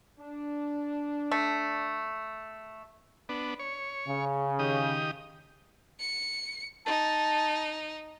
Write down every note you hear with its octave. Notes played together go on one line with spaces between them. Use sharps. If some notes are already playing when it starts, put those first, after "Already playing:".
D4
A3
B3 D4
C#5
C#3
D#3 G4 D#6
C#7
D#4 A5